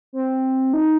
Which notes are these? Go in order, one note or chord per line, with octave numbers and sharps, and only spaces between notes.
C4
D#4